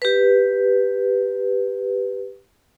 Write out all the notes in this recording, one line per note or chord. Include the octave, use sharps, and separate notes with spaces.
G4 B4